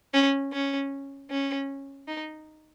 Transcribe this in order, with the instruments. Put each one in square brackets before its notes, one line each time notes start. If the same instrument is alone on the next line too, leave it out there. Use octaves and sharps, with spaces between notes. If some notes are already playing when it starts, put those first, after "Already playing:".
[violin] C#4
C#4
C#4
D#4